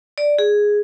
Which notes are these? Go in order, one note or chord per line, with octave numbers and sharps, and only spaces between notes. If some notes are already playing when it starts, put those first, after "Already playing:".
D5
G#4